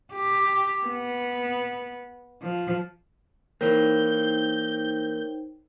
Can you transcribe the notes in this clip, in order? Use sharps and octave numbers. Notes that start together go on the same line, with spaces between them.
G4
B3
F3
E3 A#3 D#4 A#4 C5 C#5 G5 G6